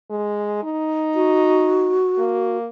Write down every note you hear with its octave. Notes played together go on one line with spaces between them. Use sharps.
G#3
D#4
F#4
A#3